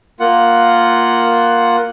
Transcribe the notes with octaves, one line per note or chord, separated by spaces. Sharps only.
A#3 F4 F#5